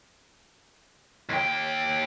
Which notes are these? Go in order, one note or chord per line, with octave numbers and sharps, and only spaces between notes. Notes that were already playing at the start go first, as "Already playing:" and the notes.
D#2 G5